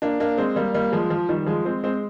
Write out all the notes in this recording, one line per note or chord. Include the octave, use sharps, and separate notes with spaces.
A#3 D4
A#3 D4
G#3 C4
G3 A#3
G3 A#3
F3 G#3
F3
D#3 G3
F3 G#3
G#3 C4
G#3 C4